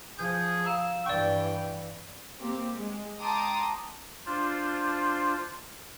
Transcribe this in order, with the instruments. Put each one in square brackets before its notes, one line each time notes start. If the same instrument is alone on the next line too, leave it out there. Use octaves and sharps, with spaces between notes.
[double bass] F3 [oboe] G#4 [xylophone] G6
[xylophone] F5 A#5 [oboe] E6
[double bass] G2 E3 [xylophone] D5 C#6 [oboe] G5
[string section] A#3 C4 G4
G#3
G5 A5 A#5 C6 D6 D#6
[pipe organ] D4 F4 C5